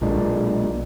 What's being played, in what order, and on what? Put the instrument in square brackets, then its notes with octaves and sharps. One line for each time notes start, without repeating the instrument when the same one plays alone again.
[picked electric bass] B1 A#2 G#3 D4